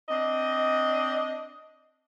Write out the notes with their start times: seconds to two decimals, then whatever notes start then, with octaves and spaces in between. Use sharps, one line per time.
0.09 C4 D4 D#5